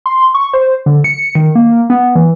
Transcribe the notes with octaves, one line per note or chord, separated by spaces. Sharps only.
C6
C#6
C5
D3
C#7
D#3
A#3
B3
E3